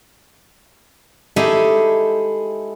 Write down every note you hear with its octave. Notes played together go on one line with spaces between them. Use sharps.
G#3 A3 D#4 E4 G4 G#4